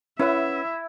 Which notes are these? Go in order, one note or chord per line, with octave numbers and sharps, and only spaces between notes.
C#4 E4 B4 E5 F#5